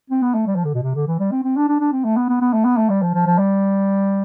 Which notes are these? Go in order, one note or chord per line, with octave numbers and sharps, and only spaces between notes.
C4
B3
A3
G3
F3
D3
B2
C3
D3
E3
G3
C4
C4
D4
D4
D4
C4
A3
B3
B3
B3
A3
B3
A3
G3
F3
F3
F3
G3